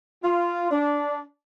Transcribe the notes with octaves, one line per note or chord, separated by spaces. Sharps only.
F4
D4